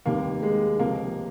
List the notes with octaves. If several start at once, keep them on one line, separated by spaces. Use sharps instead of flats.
F1 D#2 D#3 G3 A#3
G#3
C#2 C3 F3 G#3 A#3